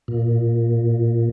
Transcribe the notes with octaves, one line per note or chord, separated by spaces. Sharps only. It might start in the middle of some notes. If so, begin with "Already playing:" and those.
A#2